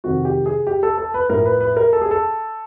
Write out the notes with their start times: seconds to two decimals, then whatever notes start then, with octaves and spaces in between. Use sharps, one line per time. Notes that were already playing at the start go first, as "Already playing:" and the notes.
0.04 F2 C3 D#3 F#4
0.25 G4
0.46 G#4
0.67 G4
0.83 A4
0.98 A4
1.14 B4
1.30 A2 F3 A#4
1.45 B4
1.60 B4
1.77 A#4
1.93 A4
2.01 G#4
2.11 A4